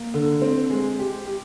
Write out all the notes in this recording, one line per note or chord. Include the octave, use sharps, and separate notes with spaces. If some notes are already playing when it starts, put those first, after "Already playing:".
Already playing: A#3
D3
C4
G#3
G4
G4